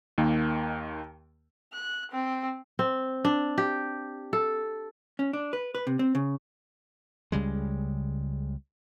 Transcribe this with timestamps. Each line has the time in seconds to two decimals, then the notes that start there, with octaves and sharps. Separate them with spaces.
0.18 D#2 D#3 A#3
1.73 F#6
2.11 C4
2.79 C4
3.25 D4
3.58 G4
4.33 A4
5.19 C#4
5.33 D4
5.53 B4
5.75 B4
5.87 C3
5.99 C4
6.15 C#3
7.32 C#2 C#3 G3 G#3